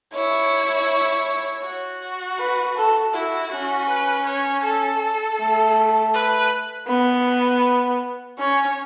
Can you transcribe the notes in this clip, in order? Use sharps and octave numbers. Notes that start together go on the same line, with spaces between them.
E4 C#5
F#4
B4
A4
E4 F#4
C#4 F#4
B4
C#5
A4
A3
B4
B3
C#4 C#5